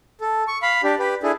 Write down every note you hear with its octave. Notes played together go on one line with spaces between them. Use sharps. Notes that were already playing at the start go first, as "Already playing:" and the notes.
A4
C#6
F5 B5
D4 G4
G4 B4
D4 E4 G#4 A4